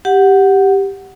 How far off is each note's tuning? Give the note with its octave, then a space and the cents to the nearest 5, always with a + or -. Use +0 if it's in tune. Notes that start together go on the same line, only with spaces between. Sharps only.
G4 +0 F#5 +0